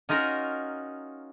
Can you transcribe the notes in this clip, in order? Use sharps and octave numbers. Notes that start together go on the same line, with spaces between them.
C#4 D#4 F4 F#4 A#4